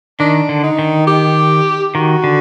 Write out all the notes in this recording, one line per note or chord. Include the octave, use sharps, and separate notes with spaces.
D#3 D4
D3
D#4
D#3
G4
D#3 F#4
D3